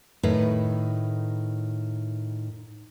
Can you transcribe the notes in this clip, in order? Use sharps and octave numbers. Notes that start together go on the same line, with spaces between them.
A2 D#3 B4